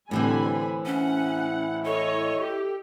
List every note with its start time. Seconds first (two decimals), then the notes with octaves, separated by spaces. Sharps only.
0.11 A2 D3 E3 G3 C4 G#5 B5
0.86 C#4 E4 F#5
1.85 A4 C#5 D#5
2.42 G4